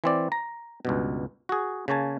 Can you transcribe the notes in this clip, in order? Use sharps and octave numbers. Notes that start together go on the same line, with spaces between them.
E3 C4 D5
A#5
C#2 G2 B2
F#4 G#4
C#3 A#3 C#5 G#5 A5